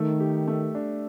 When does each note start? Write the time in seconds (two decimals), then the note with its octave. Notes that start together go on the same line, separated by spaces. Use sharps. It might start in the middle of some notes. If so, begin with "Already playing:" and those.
Already playing: D#3 A3
0.20 G4
0.48 A3
0.75 D4